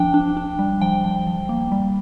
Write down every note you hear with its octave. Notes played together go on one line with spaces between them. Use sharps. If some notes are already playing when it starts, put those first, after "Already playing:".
Already playing: F3 D4 G5
D4
D4
G3
F3 G5
F3
F3
A#3
G3